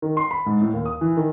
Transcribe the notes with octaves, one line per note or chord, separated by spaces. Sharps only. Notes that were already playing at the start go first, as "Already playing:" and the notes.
D#3
C6
B5
G#2
A2
D#2
D#6
E3
D#3